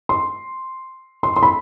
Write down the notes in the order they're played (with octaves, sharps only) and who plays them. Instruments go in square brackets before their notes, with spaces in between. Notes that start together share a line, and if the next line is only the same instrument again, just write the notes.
[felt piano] C6
C6
C6
B5